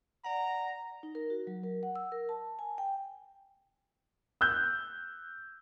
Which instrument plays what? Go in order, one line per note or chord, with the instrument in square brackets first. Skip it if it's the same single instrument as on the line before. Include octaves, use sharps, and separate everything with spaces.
[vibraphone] D5 F#5 [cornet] A#5
[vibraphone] D#4
A#4
F#4
F#3
A#4
F#5
E6
A#4
A5
G#5
G5
[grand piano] E6 F#6 G6